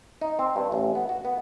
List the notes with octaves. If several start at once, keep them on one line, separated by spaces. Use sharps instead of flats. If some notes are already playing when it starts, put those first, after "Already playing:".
D#4
C4
G2
A1
B3
F#4
B3